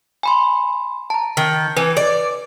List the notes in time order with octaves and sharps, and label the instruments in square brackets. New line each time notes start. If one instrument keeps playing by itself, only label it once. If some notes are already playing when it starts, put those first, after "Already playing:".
[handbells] G#5 B5 C6
A5 A#5
[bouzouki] D#3
[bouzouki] E3 [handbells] B4
[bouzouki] D5